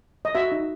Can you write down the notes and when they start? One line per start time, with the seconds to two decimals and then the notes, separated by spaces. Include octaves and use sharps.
0.25 D#5
0.35 F#4 E5
0.52 D#4